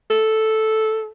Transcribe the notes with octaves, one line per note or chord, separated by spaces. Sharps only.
A4